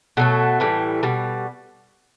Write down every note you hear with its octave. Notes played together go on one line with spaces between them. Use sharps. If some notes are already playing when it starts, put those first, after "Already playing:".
B2 F#3 A3 A4
A2 E3 G3
B2 G3